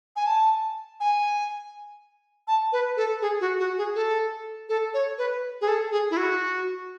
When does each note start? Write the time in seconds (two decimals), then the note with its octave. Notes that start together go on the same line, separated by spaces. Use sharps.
0.16 G#5
0.27 A5
1.00 G#5
2.48 A5
2.72 B4
2.97 A4
3.22 G#4
3.41 F#4
3.59 F#4
3.78 G#4
3.95 A4
4.69 A4
4.94 C#5
5.18 B4
5.61 G#4
5.68 A4
5.92 G#4
6.11 E4
6.17 F#4